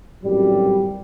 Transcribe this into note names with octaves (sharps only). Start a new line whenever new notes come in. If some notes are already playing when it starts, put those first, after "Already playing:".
G#1 F#2 A2 G3